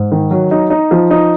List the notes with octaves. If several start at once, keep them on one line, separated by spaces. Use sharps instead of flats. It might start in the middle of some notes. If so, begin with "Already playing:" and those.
Already playing: G#2
D#3
F#3
D#4
D#4
F3
D#4